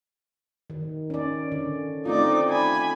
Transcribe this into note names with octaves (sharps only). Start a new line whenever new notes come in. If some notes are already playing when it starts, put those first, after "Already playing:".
D#3
C#4 D5
D3
A3 C4 D#4 F4 D5
G#5 B5